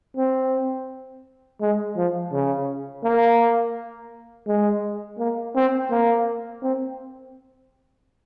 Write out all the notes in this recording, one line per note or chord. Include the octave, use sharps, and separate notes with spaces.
C4
G#3
F3
C#3
A#3
G#3
A#3
C4
A#3
C4